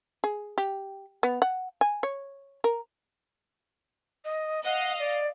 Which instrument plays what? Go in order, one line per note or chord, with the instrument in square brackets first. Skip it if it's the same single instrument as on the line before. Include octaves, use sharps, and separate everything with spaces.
[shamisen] G#4
G4
B3
F#5
G#5
C#5
A#4
[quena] D#5
[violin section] D#5 F5 [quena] F#5
[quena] D5